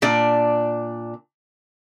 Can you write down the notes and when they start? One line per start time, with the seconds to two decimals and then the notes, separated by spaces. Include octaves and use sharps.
0.02 A#2 D4 D5